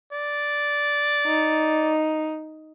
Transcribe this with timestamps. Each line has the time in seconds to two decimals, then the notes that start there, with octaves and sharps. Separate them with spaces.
0.12 D5
1.27 D#4